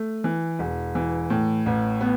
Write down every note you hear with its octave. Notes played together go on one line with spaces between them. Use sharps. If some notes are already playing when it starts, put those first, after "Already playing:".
Already playing: A3
E3
E1
E3
A2
A1
B3